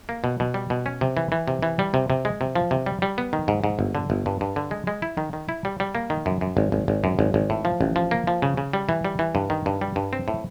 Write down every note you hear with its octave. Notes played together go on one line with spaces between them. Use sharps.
A#3
B2
B2
G3
B2
C#4
C3
E3
E3
C3
E3
G3
C3
C3
G#3
C3
F3
C3
G3
G3
B3
D#3
G#2
G#2
G1
D3
G1
G2
G2
D3
G#3
G#3
E4
D#3
D#3
E4
G3
G3
A#3
D#3
F#2
F#2
G#1
G#1
G#1
F#2
G#1
G#1
A2
F3
A1
F3
A#3
F3
C#3
C#3
G3
E3
G3
E3
G2
D#3
G2
G3
G2
C4
A2